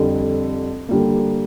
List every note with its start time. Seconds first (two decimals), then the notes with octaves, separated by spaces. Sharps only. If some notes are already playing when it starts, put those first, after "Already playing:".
Already playing: F2 D3 G3
0.88 D3 G3 A#3